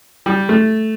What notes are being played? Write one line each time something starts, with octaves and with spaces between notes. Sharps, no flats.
G3
A3